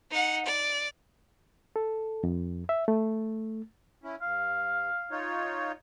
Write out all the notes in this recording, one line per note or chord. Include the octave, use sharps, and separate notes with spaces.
D#4 F#5
D5
A4
F2
E5
A3
C#4 E4
G2 F5
D#4 F4 C#5